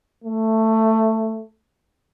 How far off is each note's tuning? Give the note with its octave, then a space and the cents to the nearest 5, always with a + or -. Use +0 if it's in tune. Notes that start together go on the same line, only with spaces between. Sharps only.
A3 +10